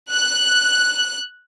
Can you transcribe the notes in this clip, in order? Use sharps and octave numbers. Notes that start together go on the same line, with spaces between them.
F#6